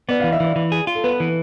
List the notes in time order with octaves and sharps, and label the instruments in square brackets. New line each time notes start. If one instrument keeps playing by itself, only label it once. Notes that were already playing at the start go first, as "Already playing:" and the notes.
[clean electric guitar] B3 [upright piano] D5
[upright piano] F5
[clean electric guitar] E3
[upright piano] E5
[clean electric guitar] E3 [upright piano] D5
[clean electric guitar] E3
G#4
F4
[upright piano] A4
[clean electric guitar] B3 [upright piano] B4
[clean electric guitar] E3